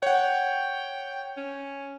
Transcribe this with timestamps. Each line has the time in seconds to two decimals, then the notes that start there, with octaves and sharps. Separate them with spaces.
0.03 C#5 F#5 G5
1.37 C#4